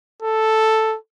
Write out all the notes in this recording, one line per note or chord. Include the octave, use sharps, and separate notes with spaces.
A4